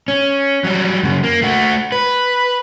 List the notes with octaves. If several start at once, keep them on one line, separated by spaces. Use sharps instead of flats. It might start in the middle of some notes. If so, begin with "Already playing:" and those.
C#4
F#3 G3
F#2 C#3
A#3
A3 F#4
B4